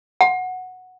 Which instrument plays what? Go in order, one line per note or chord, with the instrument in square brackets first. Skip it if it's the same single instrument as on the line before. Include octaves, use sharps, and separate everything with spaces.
[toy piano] F#5